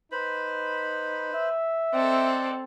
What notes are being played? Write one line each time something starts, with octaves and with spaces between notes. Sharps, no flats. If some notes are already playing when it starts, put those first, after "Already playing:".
D#4 B4 C5 B5
E5
C4 A4 D5 D#5 F#5